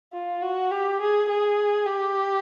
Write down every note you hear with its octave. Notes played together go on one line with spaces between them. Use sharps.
F4
F#4
G4
G#4
G#4
G4